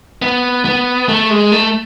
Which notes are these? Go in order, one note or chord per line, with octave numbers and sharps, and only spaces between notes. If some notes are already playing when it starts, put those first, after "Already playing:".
B3
B3
A3
G#3
A3